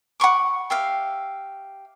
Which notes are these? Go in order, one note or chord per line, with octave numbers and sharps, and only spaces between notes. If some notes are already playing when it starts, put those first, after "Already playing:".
F#5 B5 C#6 D6
G4 E5 F5